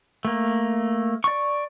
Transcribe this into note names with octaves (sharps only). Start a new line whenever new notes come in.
A3 A#3
D5 C#6